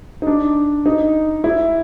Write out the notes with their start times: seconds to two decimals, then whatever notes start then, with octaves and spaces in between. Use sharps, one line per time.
0.22 D#4
0.27 D4
0.86 D#4
1.44 E4